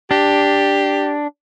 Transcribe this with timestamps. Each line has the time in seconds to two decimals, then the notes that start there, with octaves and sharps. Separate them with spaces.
0.11 D4 G4